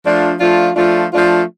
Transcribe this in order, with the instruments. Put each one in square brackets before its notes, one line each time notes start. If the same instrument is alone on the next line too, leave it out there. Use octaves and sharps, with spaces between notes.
[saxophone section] F3 A3 D4 F4
F3 A3 D4 F4
F3 A3 D4 F4
F3 A3 D4 F4